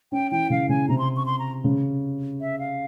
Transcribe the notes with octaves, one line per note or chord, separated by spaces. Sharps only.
C#4 G5
E3 G5
C#3 F5
C#3 G#5
C3 A#5
C6
C#6
C6
A#5
C#3
E5
F5